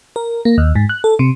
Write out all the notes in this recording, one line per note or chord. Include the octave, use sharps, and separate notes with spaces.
A#4
A#3
D#2
G#2
F#6
A4
C3